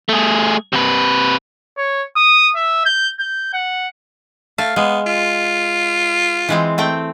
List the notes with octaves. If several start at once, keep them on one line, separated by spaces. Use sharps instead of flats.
A3 G#4
C3 B4
C#5
D#6
E5
G6
G6
F#5
A3 F5
G#3 B3
F4
E3 G#3 C4
A3 C4 G5